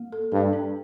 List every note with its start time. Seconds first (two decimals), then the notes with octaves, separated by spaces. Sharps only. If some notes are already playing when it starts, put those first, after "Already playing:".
Already playing: A#3
0.12 A4
0.32 G2 A4
0.53 D4